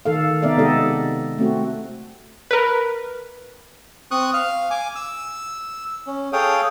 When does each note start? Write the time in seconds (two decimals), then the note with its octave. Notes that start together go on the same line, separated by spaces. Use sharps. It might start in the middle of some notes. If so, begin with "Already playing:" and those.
0.05 D#3 A4 F5
0.43 C3 B3 D#4 D5 E5 F5
0.57 C3 G#3 B3 G4 A4 D#5
1.38 A3 C4 F#4
2.51 A#4 B4
4.11 C4 C#6 D#6 F#6
4.34 F5 F6
4.70 G#5 D6
4.96 E6
6.07 C#4
6.33 G#4 A4 C#5 F5 G5 D#6